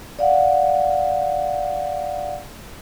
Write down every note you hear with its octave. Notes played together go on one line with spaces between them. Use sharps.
D5 F5 F#5